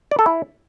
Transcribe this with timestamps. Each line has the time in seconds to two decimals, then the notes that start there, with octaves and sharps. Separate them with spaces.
0.11 D5
0.19 A4
0.26 E4